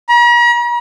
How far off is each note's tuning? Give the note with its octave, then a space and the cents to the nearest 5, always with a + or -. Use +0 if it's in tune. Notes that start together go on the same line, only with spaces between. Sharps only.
A#5 +45